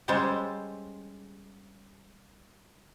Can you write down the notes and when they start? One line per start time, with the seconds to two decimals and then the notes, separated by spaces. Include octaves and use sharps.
0.08 G3 G#3 C#4 A4 C5